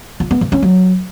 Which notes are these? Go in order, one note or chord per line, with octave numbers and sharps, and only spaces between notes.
F4
B3
E3
C#4
F#3